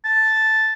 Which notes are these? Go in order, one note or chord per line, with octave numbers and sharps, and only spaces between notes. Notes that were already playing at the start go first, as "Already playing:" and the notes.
A5